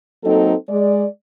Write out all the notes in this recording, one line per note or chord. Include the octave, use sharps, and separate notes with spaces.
F#3 A#3 C4 D#4 A4
G#3 D5